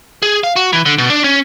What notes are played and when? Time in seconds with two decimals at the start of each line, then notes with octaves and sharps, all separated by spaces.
0.22 G#4
0.44 F5
0.56 F#4
0.73 E3
0.86 D3
0.98 B2
1.10 D4
1.24 C#4